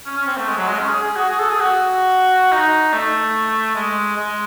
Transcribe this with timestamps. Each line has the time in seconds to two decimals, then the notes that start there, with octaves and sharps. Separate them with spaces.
0.06 C#4
0.16 C#4
0.27 C4
0.37 A3
0.48 G#3
0.57 F#3
0.67 G#3
0.79 C#4
0.89 G#4
1.03 G#4
1.16 F#4
1.29 G#4
1.40 A4
1.50 G#4
1.60 F#4
2.52 D#4
2.93 A3
3.76 G#3
4.16 G#3